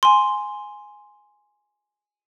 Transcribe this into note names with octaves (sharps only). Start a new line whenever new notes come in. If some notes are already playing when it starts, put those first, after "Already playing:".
G#5 C6